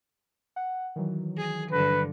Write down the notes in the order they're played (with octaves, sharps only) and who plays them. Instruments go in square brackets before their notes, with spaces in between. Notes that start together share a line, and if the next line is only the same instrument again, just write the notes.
[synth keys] F#5
D#3 E3 F#3
[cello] G#4
[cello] G2 D3 [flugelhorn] B4